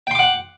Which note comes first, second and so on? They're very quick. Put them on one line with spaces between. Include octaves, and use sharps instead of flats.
G5 C6 D6 F#5